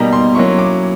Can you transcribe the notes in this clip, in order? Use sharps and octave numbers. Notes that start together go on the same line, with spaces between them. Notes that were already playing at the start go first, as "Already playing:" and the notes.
Already playing: B2 G3 A#3 D#4 A#5
C6
F#3 A#3 C#4 E4 C#6
D6